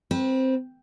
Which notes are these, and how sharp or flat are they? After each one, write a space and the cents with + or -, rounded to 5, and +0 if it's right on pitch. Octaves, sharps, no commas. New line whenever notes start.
C4 +0 B4 -30